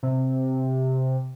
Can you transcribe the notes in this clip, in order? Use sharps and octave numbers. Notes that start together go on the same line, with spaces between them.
C3